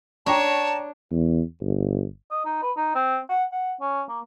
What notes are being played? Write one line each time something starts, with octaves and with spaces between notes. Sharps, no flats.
D4 C#5 G5 A5 A#5 C#6
E2
G1
D#5
D#4
B4
D#4
C4
F#5
F#5
C#4
A#3